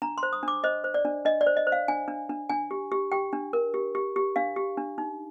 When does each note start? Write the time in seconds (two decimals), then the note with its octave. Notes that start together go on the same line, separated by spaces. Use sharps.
0.02 D4 A#5
0.18 C6
0.23 C5
0.33 D#6
0.43 D4 D6
0.64 C5 D#5
0.84 C5
0.94 D5
1.05 D4
1.25 D4 D#5
1.41 D5
1.47 C5
1.57 D#5
1.67 C5
1.72 F5
1.88 D4 G#5
2.08 D4
2.30 D4
2.49 D4 G#5
2.71 G4
2.92 G4
3.12 G4 G5
3.33 D4
3.53 A#4
3.74 G4
3.95 G4
4.16 G4
4.36 D4 F5
4.56 G4
4.77 D4
4.98 D#4